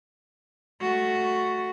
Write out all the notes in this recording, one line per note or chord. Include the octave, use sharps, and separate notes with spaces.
A3 F#4